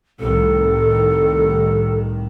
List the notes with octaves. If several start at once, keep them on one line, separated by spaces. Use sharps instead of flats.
C2 A2 D#3 A4